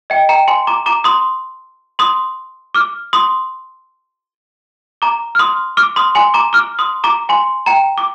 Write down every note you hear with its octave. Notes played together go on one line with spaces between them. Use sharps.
D#5 G5
G5 A#5
G#5 C6
A#5 D6
A#5 D6
C6 D#6
C6 D#6
D6 F6
C6 D#6
A#5 D6
F6
C6 D#6
D6 F6
C6 D#6
G#5 C6
A#5 D6
D6 F6
C6 D#6
A#5 D6
G#5 C6
G5 A#5
D6